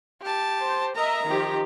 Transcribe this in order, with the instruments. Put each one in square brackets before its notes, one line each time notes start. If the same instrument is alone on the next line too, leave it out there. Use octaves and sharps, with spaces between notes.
[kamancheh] G4 A5
[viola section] C5
[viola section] A#4 D#5 E5 [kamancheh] A#5
[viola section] D#3 F3 G4